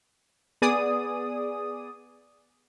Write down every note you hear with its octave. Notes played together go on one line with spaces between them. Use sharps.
B3 G#4 D5 D#6